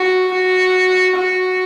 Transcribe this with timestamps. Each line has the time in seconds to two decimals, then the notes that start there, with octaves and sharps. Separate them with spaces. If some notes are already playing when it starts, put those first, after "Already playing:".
Already playing: F#4
0.32 F#4
1.16 F#4